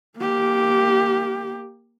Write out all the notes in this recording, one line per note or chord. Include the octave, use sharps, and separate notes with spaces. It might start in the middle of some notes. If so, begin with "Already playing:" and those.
A#3 G4